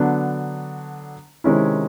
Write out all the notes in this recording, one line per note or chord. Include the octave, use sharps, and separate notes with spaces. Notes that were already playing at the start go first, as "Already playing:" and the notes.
Already playing: D3 F#3 B3 D4
C3 D#3 G#3 C#4 E4